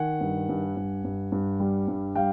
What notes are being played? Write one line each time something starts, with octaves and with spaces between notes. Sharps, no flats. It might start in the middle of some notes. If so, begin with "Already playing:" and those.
Already playing: D#3 F#5 G#5
G2
G2
G2
G2
G2
G3
G2
G3 F5 G5